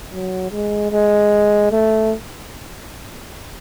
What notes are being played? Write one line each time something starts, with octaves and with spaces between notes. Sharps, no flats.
F#3
G#3
G#3
A3